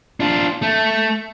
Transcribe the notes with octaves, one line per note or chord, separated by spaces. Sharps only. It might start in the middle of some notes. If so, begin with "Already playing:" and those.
D4 F4
A3